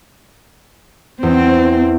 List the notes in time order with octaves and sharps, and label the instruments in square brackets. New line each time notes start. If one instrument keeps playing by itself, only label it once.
[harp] E2 [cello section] C4